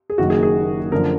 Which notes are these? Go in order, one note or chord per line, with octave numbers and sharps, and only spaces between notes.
G#4
F#1 F#2 D#3 A#3 D#4 F#4
G#4
G#4
F#1 F#2 D3 F3 A#4